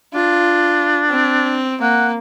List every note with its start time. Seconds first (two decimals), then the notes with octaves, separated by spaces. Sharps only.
0.14 D4 F4
1.10 C4
1.81 A#3 F#5